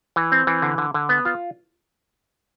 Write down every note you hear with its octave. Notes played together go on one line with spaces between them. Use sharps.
E3
C4
E3
D3
D3
D3
B3
F4